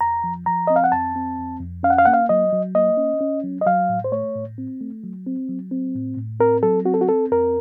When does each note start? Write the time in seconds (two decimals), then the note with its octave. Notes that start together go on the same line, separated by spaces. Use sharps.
0.01 F2 A#5
0.24 F3
0.46 F3 A#5
0.67 C4 D#5
0.76 F5
0.84 F#5
0.92 F2 A5
1.16 C4
1.39 F2
1.60 F2
1.83 C#4 F5
1.90 F#5
1.98 F5
2.05 A#3 F#5
2.13 F5
2.29 F#3 D#5
2.53 F#3
2.75 A#3 D#5
2.97 C#4
3.21 C#4
3.44 F#3
3.61 D#5
3.67 F#3 F5
3.89 A2
4.04 C5
4.12 A3 C#5
4.35 A2
4.58 C4
4.81 A3
5.04 F#3
5.27 C4
5.49 F#3
5.71 C4
5.95 A2
6.17 A2
6.40 C4 A#4
6.63 F#3 A4
6.85 C4 F#4
6.94 A4
7.01 F#4
7.09 C4 A4
7.32 F2 A#4